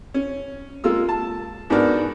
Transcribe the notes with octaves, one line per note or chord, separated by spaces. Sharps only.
C#4
G#3 A#3 F4 E6
A5
G#2 B3 D4 F#4 A#4 D5